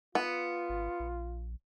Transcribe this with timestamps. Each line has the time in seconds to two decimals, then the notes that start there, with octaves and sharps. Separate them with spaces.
0.15 B3 F4
0.69 G#1
1.00 A#1